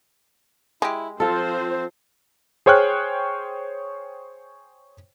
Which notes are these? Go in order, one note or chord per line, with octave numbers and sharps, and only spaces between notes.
G#3 E4 G4
F3 C4 F4 A4 C5
G#4 C5 C#5 G5 F6 F#6